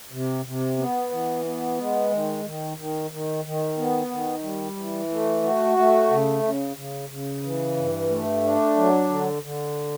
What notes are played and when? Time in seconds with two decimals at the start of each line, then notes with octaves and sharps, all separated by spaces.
0.12 C3
0.45 C3
0.78 B3
1.11 E3
1.45 B3
1.78 G#3
2.12 D#3
2.45 D#3
2.77 D#3
3.11 D#3
3.45 D#3
3.78 B3
4.10 D#3
4.43 G3
4.77 E3
5.10 A3
5.43 F#4
5.78 A3
6.11 C#3
6.43 C#3
6.77 C#3
7.10 C#3
7.43 E3
7.76 G2
8.09 A3
8.43 D4
8.76 F#3
9.09 D3
9.43 D3